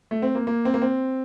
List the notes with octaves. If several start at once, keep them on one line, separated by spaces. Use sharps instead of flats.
A3
C4
A#3
A#3
C4
A#3
C4